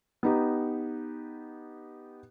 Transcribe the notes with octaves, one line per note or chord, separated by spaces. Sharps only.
B3 D#4 G4